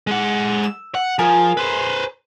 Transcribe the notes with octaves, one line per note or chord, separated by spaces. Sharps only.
G#3 F#5
E6
F#5
F3 G#4 A#4 G#5
B4 C5